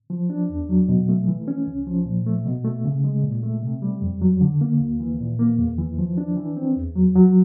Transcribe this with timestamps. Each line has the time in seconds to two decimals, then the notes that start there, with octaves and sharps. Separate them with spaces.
0.10 F3
0.30 D4
0.49 E2
0.69 F#3
0.89 B2
1.09 A3
1.28 E3
1.48 C#4
1.67 C2
1.87 F3
2.06 A#2
2.26 A3
2.46 B2
2.64 A3
2.85 C#3
3.04 G#3
3.23 A#2
3.43 A3
3.63 C3
3.82 G3
4.01 F2
4.21 F#3
4.41 D3
4.61 A#3
4.80 D2
5.00 E3
5.20 A#2
5.39 A#3
5.59 E2
5.78 E3
5.98 F3
6.17 D4
6.37 E3
6.57 C4
6.76 E2
6.95 F#3
7.16 F#3